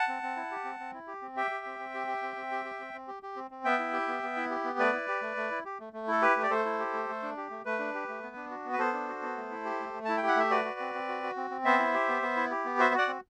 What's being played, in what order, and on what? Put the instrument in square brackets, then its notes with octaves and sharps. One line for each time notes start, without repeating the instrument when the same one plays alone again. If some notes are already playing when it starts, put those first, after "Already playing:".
Already playing: [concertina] F#5 A5
C4
C4
E4
G4
C4
C4
E4
G4
C4
G4 E5 G5
G4
C4
C4
G4
G4
C4
C4
G4
G4
C4
C4
G4
G4
C4
C4
B3 E5 G5
E4
G4
B3
B3
E4
G4
B3
A3 B4 D5
E4
G4
A3
A3
E4
G4
A3
A3
E4 A4
G4 B4
A3
D5
A3 A4 C5
E4
G4
A3
A3
D4
G4
A3
A3 B4
D4
G4
A3
B3
D4
F#4
B3
B4
B3 A4 C5
D4
F#4
B3
A3
E4
G4
A3
A3
E4 A5
G5
G4
F#5
A3 E5
F#4 B4 D5
F#4
C4
C4
F#4
F#4
C4
C4
B3 C5 E5
E4
G4
B3
B3
E4
G4
B3
F#4 C5 E5
F#4 D5 F#5
C4